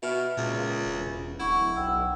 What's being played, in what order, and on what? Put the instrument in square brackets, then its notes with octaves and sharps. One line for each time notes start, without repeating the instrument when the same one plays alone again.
[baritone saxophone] B2 [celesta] E5 F6
[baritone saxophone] C#2 [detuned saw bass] A#2
[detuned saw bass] E1
[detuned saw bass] D1 [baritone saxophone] E4 [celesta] F#5 C#6
[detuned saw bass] B1 [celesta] F#5 G5 E6